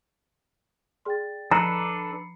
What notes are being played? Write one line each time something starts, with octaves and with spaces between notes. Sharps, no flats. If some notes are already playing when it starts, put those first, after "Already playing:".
G#4 D5 G5 C6 A6
F3 D4 A4 B4 A#5 B5 C7 C#7